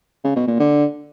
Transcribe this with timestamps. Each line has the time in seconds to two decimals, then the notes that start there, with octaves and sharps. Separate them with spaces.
0.24 C#3
0.36 B2
0.48 A#2
0.59 D3